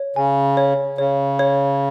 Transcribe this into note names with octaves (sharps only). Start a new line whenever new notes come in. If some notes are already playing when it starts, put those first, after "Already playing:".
Already playing: C#5
C#3 G#5
C#5
C#3 C#5
C#5